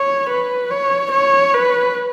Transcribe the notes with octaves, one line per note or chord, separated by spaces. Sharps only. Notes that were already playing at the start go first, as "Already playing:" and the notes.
Already playing: C#5
B4
C#5
C#5
B4